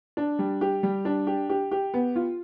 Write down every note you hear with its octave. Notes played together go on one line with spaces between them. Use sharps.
D4
G3
G4
G3
D4
G4
G4
G4
B3
F4